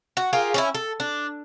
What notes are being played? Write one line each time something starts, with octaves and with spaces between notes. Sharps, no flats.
F#4
F4 G4 G#4 A#4
C#4 D#4 E4
A4
D4